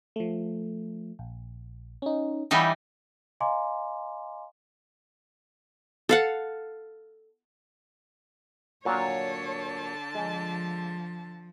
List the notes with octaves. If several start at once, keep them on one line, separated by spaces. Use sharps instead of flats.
F3 A3
A#1
C#4 D#4
E3 G3 D#4 E5 F#5 B5
D#5 F5 G#5 A#5 C6 D6
A4 F5 F#5
A#2 D3 F#3 A#3 C#5 A5
F3 G#3